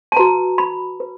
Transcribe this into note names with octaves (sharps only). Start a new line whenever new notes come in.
A5
F#4 B4 A#5
B5
B4